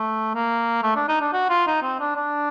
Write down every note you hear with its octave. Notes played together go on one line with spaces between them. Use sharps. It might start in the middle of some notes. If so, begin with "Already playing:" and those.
Already playing: A3
A#3
A3
D4
D#4
D4
F#4
F4
D#4
C4
D4
D4